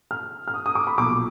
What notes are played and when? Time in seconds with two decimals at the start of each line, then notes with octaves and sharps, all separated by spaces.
0.11 F6
0.48 F6
0.54 D#6
0.66 D#6
0.75 D6
0.87 B5
0.97 B1 A#2 F3 D6